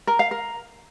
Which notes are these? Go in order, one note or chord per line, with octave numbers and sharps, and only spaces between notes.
A#4
F5
A#4